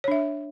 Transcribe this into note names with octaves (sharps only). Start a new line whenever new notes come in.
D4 C#5 E5